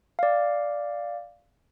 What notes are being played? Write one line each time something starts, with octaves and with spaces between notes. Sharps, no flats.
D5 F5